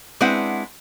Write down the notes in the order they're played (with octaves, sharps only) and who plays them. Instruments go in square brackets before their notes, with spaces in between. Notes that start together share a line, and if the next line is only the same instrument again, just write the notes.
[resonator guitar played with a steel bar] G#3 C4 D4 E4 B4 F#5